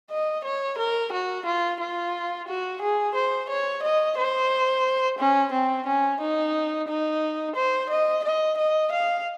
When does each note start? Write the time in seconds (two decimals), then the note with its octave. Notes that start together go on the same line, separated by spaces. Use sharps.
0.10 D#5
0.44 C#5
0.78 A#4
1.12 F#4
1.46 F4
1.80 F4
2.48 F#4
2.82 G#4
3.15 C5
3.49 C#5
3.83 D#5
4.17 C5
5.19 C#4
5.52 C4
5.86 C#4
6.20 D#4
6.88 D#4
7.56 C5
7.89 D#5
8.24 D#5
8.57 D#5
8.92 F5